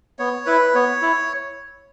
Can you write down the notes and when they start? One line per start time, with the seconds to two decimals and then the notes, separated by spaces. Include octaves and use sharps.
0.19 B3 C#5
0.46 E4 B4
0.75 B3 C#5
1.02 E4